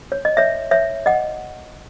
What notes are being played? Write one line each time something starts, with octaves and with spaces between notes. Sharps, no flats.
C#5
D#5
C#5 E5
C#5 E5
D#5 F#5